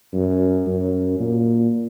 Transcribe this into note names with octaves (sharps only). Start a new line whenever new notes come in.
F#2
F#2
A#2